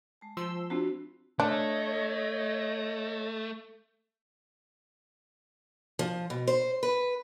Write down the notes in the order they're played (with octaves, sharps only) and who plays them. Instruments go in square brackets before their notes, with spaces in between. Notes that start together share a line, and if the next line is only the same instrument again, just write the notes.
[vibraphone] G#3 A5
[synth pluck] F3 C6 E6
[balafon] C4 D4 F4 [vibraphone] F#4
[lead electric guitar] A3 [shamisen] D4 [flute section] C#5 D#5
[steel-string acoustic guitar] F3
B2
C5
B4